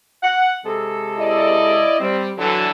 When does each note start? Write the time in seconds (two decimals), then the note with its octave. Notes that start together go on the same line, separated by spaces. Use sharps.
0.23 F#5
0.66 C3 G#3 A4
1.17 E4 D5 D#5
2.00 G3 C4
2.38 D3 E3 F#3 A4